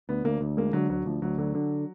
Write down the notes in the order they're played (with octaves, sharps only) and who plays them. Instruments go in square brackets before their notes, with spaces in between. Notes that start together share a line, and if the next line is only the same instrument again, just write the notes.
[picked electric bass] D2 [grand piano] B3
[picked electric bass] D2 [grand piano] A#3
[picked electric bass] D2
[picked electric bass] G#3 [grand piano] A#3
[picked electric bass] D3 [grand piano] F#3
[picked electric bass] D2 [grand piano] F#3
[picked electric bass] D2 [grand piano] F3
[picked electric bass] D2 [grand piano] F#3
[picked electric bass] D3 [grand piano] F#3
[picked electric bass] D3